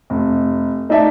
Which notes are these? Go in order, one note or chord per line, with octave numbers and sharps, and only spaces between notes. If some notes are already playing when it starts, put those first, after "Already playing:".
F1
A3 D#4 A4 D5 E5 A5